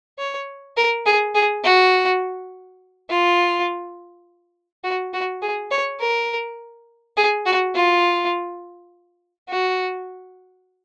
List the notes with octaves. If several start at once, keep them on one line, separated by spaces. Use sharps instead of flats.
C#5
A#4
G#4
G#4
F#4
F4
F#4
F#4
G#4
C#5
A#4
G#4
F#4
F4
F#4